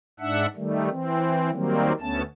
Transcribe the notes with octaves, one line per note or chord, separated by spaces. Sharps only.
G#2 D4 E5 F#5
D#3 G3 A3
E3 C4
D#3 F#3 G3 A#3 C4
D2 A3 B3 C#4 A5